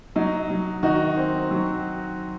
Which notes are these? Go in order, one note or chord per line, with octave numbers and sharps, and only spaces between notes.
F#3 D#4
F#3
D#3 D#4 F#4
C4
F#3